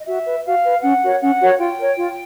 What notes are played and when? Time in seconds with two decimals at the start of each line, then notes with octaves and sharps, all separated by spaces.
0.02 D#5
0.06 F#4 E5
0.25 B4
0.44 F#4 F5
0.64 B4
0.82 C#4 F#5
1.01 F#4 A#4 C#5
1.20 C#4 F#5
1.40 F#4 A#4 C#5
1.57 F4 G5
1.78 A#4 C#5
1.96 F4